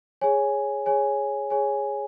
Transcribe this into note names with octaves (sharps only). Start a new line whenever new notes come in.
G#4 C#5 G#5
G#4 C#5 G#5
G#4 C#5 G#5